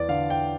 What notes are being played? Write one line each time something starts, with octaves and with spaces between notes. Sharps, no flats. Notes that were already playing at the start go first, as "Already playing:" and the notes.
Already playing: E2 D5
D3 F5
G5